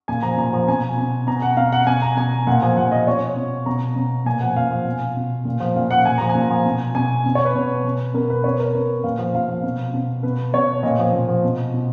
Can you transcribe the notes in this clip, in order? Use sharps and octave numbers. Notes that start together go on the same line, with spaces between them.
A#2 G#5
F3 A#5
A#2 A#5
F3
B2 G#5
B2
B2 A#5
F#5
B2 F5
F#5
B2 G#5
A#5
B2 G#5
A#2 F#5
F3 G#5
A#2 F#5
F3 D#5
B2 C#5
B2
B2 A#5
B2
A#2 G#5
F3 F#5
A#2 F5
F3
B2
B2
A#2
F3
A#2 F5
F3 F#5
A#2 G#5
F3 A#5
G#5
A#2
F3
B2
B2 G#5
B2
C#5
B4
B2
B2
B2 A#4
B4
B2 C#5
A#4
B2 B4
A#2 F5
F3
A#2 F5
F3
B2
B2
B2 B4
B2 C#5
A#2 D#5
F3
A#2
F3
B2
B2